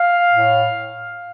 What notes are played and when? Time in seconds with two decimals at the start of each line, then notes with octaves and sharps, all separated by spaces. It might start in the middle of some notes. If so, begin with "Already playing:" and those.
Already playing: F5
0.31 A2